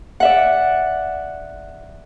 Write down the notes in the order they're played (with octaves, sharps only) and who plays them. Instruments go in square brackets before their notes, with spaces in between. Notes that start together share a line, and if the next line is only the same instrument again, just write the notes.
[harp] D5 E5 F#5